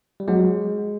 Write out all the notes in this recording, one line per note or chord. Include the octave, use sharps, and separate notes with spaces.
G3
F#3 G#3